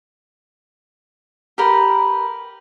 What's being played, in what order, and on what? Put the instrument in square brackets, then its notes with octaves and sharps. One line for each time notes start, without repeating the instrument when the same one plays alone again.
[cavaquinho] G4 A#4 B4 G5